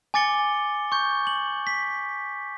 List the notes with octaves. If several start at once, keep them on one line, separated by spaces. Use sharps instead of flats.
G#5 D6 A6 C#7 G7
C#6 G6
F#7
B6